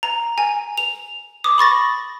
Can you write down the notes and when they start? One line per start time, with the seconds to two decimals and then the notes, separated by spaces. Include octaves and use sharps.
0.03 A#5
0.38 G#5
0.78 F7
1.44 D6 D#6
1.58 B5 C#6 A6 A#6